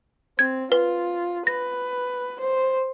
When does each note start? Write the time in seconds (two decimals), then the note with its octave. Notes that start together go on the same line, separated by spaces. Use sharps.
0.39 C4 G#6
0.72 F4 B4
1.47 B4 A#6
2.41 C5